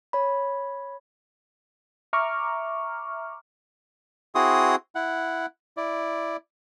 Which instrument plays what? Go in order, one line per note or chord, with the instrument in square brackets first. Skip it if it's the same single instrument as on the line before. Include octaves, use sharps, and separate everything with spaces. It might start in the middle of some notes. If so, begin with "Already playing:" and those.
[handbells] C#5 B5
[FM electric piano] E5 A#5 C#6 D6 F6
[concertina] C4 E4 F#4 G#4 C6 D#6
E4 F#5
E4 D5